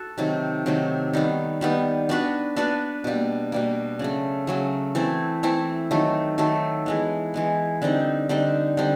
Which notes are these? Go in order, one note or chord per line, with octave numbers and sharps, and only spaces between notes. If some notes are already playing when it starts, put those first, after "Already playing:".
Already playing: F#4 A4
C3 D#3 F#3 A3
C3 D#3 F#3 A3
D#3 G3 B3
D#3 G3 B3
B3 D4 F#4 B4
B3 D4 F#4 B4
B2 G3 A#3
B2 G3 A#3
C#3 F#3 A3
C#3 F#3 A3
E3 A3 C4 E4
E3 A3 C4 E4
D#3 F#3 A3
D#3 F#3 A3
E3 G#3 B3
E3 G#3 B3
D3 G3 C4 D#4
D3 G3 C4 D#4
D3 G3 C4